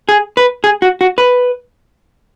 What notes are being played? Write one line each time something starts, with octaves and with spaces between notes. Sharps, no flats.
G#4
B4
G#4
F#4
F#4
B4